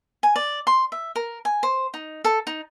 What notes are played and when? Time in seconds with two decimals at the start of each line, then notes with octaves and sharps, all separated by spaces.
0.23 G#5
0.36 D5
0.67 C6
0.92 E5
1.16 A#4
1.45 G#5
1.63 C5
1.94 D#4
2.24 A4
2.47 D#4